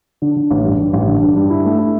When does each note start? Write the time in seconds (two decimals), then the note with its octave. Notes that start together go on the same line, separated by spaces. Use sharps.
0.22 D3
0.36 D3
0.51 A1
0.65 G2
0.79 G2
0.93 A1
1.07 D3
1.22 G2
1.36 G2
1.50 E4
1.65 A3
1.79 E4